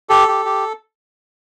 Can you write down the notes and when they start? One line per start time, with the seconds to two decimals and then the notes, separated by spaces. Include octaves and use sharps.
0.09 G4 A4
0.28 G4
0.46 G4